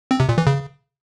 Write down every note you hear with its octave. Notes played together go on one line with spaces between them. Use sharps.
C4
C3
A#2
E3
C#3